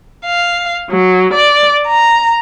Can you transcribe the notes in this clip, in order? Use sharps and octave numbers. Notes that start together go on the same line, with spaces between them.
F5
F#3
D5
A#5